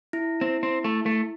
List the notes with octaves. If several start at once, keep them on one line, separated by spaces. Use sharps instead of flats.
E4
C4
C4
A3
A3